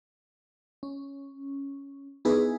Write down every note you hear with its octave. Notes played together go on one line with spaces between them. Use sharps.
C#4
B3 D#4 E4 G#4 B4